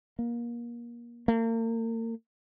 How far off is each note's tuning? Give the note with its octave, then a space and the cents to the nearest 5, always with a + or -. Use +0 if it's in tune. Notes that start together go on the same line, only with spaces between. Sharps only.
A#3 +25
A#3 -40